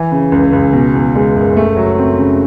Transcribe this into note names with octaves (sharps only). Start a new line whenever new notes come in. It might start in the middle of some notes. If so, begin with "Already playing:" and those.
Already playing: E3
C#3
C#2
C#2
B2
E2
G#3
F#1
A3
F#3
C4
C#3